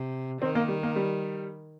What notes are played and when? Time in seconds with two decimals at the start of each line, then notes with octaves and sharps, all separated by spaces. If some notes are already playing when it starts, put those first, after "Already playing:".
Already playing: C3
0.41 D#3 C4
0.55 A#3
0.68 G3
0.83 A#3
0.96 G3